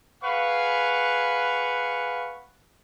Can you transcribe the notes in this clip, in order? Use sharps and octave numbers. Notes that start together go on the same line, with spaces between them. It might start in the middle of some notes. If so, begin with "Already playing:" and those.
G#4 B4 F5 F#5 C#6